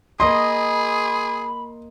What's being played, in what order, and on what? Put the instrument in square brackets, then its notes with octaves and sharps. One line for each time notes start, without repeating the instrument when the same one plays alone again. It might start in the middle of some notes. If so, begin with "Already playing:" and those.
[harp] A#3 D#5 A#6 [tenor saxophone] G#4 [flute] B5 [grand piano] C6